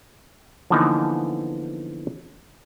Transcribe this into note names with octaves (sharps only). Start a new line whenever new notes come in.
D3 E3 F3 A#3 B3 D#4